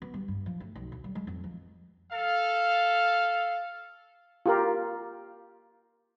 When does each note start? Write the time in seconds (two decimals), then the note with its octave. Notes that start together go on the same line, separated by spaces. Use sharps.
0.02 B3
0.14 G3
0.28 G2
0.46 F3
0.60 A3
0.75 B1
0.92 D2
1.04 G3
1.15 G#3
1.27 F2
1.44 F3
2.11 A4 F5
4.46 F4 G4 A#4